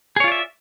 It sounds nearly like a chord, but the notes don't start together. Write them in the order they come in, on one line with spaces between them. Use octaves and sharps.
G#4 C#5 F4 D5 E5